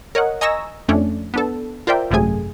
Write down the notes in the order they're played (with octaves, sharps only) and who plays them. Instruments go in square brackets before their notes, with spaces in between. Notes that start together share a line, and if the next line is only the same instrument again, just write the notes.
[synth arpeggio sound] A#4 C#5 D#5 F#5
D#5 G#5 A#5 C#6 E6 A#6
F2 A3 C#4 D4
B3 D4 A4
F4 A#4 C5 D5 E5 G5
G#1 F#2 C3 A3 G#4 G#5